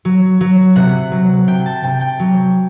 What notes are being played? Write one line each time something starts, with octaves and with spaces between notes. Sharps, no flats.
F#3
F#3
C3 F#5
F#3
C3 G5
A5
C3 G5
G5
F#3